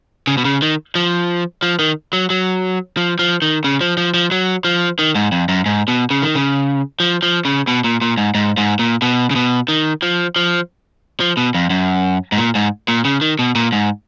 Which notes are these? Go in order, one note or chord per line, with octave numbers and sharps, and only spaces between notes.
C#3
B2
C#3
D#3
F3
F3
D#3
F#3
F#3
F3
F3
D#3
C#3
F3
F3
F3
F#3
F3
D#3
G#2
F2
F#2
G#2
B2
C#3
D#3
C#3
F3
F3
C#3
B2
A#2
A#2
G#2
G#2
G#2
A#2
B2
C#3
B2
D#3
F3
F3
F3
B2
F2
F#2
G#2
A#2
G#2
A#2
C#3
D#3
B2
A#2
G#2